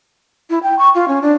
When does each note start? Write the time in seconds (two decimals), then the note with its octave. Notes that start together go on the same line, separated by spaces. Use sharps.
0.50 E4
0.63 G5
0.79 C#6
0.95 F4
1.08 C#4
1.22 D4